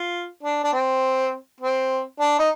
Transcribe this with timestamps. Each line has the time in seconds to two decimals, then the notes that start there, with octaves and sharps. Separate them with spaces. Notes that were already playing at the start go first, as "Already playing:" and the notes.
Already playing: F4
0.43 D4
0.64 D4
0.73 C4
1.61 C4
2.20 D4
2.39 D#4